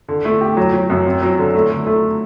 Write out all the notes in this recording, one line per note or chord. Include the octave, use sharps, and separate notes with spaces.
D3
A3
G4
F#3
F#3
F#2
C4
F#3
D3
A3
D3
A3